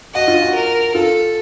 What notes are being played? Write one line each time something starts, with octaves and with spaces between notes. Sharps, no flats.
F#4 D#5
F4
F#4
A#4
F4 A4